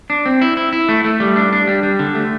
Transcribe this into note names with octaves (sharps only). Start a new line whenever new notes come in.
D4
C4
E4
E4
E4
A3
A3
G3
D4
D4
G3
G3
D3
A3